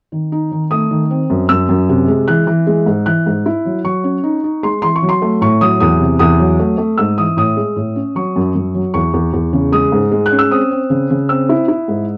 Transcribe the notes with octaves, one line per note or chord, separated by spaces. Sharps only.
D#3
D#4
D#3
A3 D#6
D#3
C4
F#2
F#2 E6
F#2
C3
G#3
E3 F#6
E3
G#3
G#2
E3 F#6
G#2
E4
F#3
F#3 C#6
C#4
D#4
D#4
G#3 C6
E3 C6
C#6
F#3
C6
A3
A2 C#6
F#3 D#6
E2 D#6
C3
E2 D#6
F#3
A3
A3
G#2 E6
E3 D#6
A2 D#6
G#3
A2
C#4
F#3 C#6
F#2
F#2
F#3
E2 C#6
E2
E2
C#3
G#3 D#6
G#2
G#3
F#6
C#4
E6
C4 D#6
C4
C#3
C#3
C4 E6
E4
E4
G#2